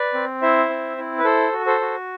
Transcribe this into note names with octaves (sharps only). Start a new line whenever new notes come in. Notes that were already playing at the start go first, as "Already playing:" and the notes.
Already playing: B4 D5
C4
E4 C5 E5
C4
E4
B4
A4 C5
F#4
A4 C5
F#4